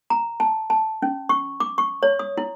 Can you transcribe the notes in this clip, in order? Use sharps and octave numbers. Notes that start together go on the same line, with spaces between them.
A#5
A5
A5
C#4
C#6
D6
C#6
C#5
D#6
E4